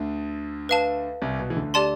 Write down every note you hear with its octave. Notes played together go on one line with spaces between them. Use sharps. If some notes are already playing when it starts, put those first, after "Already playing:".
Already playing: D2 D3
B4 F5 A5
C2 C3
B2
E3
D2 D3
G4 D5 A5 C6